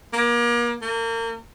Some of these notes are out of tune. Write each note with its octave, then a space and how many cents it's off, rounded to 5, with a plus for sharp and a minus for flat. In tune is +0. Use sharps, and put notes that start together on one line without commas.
A#3 +35
A#3 -35